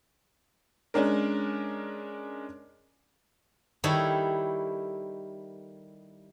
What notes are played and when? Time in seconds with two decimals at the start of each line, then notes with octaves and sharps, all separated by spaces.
0.94 G#3 C#4 D4 A#4
3.84 D#3 G3 E4 A4 C#5